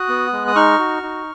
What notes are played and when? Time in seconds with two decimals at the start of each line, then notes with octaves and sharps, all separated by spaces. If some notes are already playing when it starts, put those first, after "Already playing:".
Already playing: F#4 D#6 F#6
0.09 B3
0.33 G#3
0.48 D#6
0.55 D#4 C#6 F6
0.79 F#4
1.03 D#4